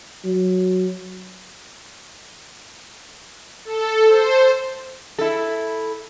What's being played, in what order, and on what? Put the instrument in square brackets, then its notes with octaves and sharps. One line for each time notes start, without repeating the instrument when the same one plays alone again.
[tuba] F#3
[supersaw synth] A4
C5
[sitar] E4 A4